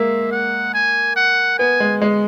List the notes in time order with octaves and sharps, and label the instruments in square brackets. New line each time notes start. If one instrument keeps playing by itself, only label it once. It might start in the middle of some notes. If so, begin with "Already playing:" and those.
Already playing: [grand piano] G#3 A#3 [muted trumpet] E5
[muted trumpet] F#5
G#5
F#5
[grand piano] B3 [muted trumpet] G#5
[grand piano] G#3
G#3